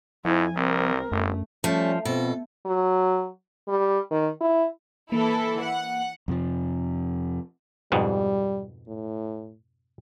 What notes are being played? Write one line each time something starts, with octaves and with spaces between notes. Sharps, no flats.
F2 F3 E4 G#5
C2 C4 A#4
G1 F#2 A3
F3 G3 A3 C#4
F2 B2 C4 A4
F#3
G3
D#3
E4
E3 A#3 E4 A4
F#5
F2 C3 F3
F2 G#2 B2 G3
A2